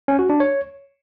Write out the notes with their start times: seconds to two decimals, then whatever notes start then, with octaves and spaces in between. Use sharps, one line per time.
0.08 C#4
0.19 F#4
0.30 D4
0.40 C#5